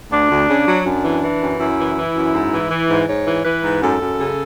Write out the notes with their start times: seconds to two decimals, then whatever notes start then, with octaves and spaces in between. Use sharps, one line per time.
0.12 D2 D4
0.31 D2
0.50 C#3
0.68 F#3
0.86 F#2 D4
1.05 E3
1.24 E3
1.42 F#2
1.60 F#2 E4
1.79 E3
1.97 E3
2.16 F#2
2.34 G#2
2.53 E3
2.71 E3
2.90 G#2
3.08 G#2 C#5
3.27 E3
3.45 E3 B4
3.64 G#2
3.82 F#2 A4
4.01 F#2
4.19 C#3